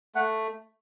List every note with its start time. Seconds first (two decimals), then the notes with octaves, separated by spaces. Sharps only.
0.15 A3 F#5